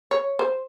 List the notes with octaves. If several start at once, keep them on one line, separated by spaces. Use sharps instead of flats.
C#5
C5